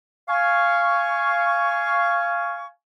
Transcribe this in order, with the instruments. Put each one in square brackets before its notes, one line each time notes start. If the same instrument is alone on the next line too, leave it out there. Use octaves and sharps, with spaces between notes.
[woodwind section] F5 G#5 C#6